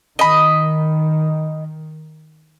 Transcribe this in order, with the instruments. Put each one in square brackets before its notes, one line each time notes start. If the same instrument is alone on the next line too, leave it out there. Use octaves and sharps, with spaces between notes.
[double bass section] D#3 [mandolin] D#5 B5